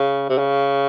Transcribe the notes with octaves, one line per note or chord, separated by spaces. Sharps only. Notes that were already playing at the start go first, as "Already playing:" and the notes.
Already playing: C#3
C3
C#3